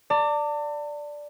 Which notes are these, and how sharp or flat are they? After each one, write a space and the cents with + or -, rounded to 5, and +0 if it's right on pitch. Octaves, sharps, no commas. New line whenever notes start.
D5 +0 A5 +40